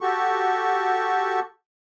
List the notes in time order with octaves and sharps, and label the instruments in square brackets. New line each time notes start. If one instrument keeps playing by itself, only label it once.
[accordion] F#4 G4 A4 C#6